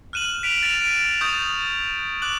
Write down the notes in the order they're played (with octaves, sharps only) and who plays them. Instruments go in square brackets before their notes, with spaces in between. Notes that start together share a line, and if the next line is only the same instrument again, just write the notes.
[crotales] F6 F#6 D#7 E7 F#7
B6 D7 F7
A6 B6 E7 F7
D7 D#7
C#6 D#6 G6 A6 F7
D6 F#6 F#7